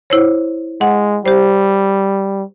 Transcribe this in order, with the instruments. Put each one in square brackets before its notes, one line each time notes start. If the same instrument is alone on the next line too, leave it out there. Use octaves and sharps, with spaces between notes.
[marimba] E4 C5 C#5
[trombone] G#3 [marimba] F#5
[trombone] G3 [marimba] G4 C5